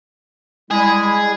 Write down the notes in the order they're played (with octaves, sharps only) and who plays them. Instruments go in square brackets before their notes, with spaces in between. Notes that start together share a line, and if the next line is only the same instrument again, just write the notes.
[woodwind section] G3 G#3 E4 [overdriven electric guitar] G#4